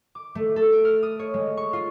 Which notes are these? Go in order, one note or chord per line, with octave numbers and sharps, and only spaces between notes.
D6
A3
A4
D7
F6
D#6
C#5
G#3
C#6
F4